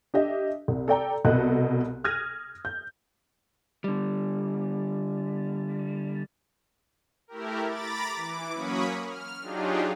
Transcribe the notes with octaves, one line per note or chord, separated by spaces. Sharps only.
D4 G4 D#5 E5
C2
A4 D5 G5 A#5
C2 B2 A4 D#5 F#6
D#6 F6 F#6 G#6 A#6 D#7
G6
D3 G3
A3 E4 G4 A#4
A#5 B5 D6 A6
E3 D6
F#3 A#3 C#4 B5 C#6 D#6
F6
F#3 D4 D#4 F4 G4 G#4